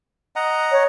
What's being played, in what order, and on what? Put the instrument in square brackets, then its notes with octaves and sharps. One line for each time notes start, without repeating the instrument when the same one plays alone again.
[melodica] D#5 F#5 A#5
[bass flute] C#5